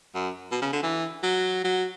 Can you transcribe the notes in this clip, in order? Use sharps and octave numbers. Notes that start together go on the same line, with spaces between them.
F#2
B2
C#3
D3
E3
F#3
F#3